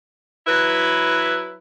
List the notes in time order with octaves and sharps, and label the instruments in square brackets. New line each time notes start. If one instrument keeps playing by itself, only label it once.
[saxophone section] F#3 E4 B4